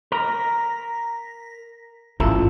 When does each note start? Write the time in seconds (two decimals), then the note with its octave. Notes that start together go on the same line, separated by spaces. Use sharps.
0.12 A#4 A#6 B6
2.20 A1 G#2 E4 F4 A4